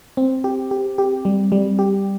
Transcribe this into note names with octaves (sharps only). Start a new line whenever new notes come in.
C4
G4
G4
G4
G3
G3
G4